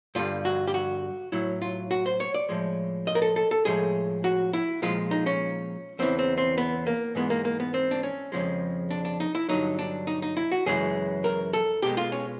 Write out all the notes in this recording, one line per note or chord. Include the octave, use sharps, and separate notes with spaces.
G2 D3 G3 F4
F#4
G4
F#4
A2 F#3 E4
F4
F#4
C5
C#5
D5
A2 F3 G#3
D#5
A#4
A4
A4
A4
A2 F3 G#3 G#4
F#4
E4
A#2 F3 G#3 F4
D#4
C#4
E2 C#3 E3 C4
C4
C4
B3
A#3
G#2 E3 G#3 B3
A#3
A#3
B3
C4
D4
C#4
F2 C#3 F3 G#3
D4
D4
D#4
E4
G2 D3 F#3 D#4
D4
D#4
D#4
E4
F#4
F#2 C#3 E3 G#3 G#4
A#4
A4
B2 G#3 G4
F4
C#4